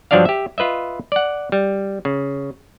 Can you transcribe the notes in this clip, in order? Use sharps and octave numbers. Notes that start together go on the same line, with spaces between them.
G2 F3 F#3 D4 D5 F5
G4 E5
F4 B4 D#5 E5
D5 F#5
G3
C#3